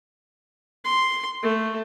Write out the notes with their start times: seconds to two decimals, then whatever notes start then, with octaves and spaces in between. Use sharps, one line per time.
0.84 C6
1.43 A3